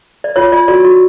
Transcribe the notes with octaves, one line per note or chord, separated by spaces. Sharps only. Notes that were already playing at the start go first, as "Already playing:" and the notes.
D5
F4 C#5
F4 D5
F#4 D5
F#4